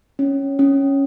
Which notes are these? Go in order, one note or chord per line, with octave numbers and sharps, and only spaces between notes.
C#4
C#4